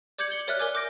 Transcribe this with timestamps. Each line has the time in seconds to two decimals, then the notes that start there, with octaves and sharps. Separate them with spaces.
0.18 D5 D6 G6 G#6 C#7 F#7
0.32 C#7 G7
0.47 A#4 C#5 D5 E5 F6 F#6
0.60 A#4 G#5 D6
0.75 D6 G6 A#6 D7